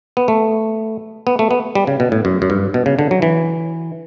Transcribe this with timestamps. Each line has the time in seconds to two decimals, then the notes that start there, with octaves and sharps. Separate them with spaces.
0.17 B3
0.28 A3
1.27 B3
1.39 A3
1.51 B3
1.75 G3
1.87 C#3
2.00 B2
2.12 A2
2.25 F#2
2.42 F#2
2.50 G2
2.74 B2
2.86 C#3
2.99 D3
3.11 F#3
3.22 E3